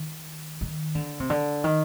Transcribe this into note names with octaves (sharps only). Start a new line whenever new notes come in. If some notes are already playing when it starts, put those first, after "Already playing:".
Already playing: D#3
D#3
D3
C3
D3
D#3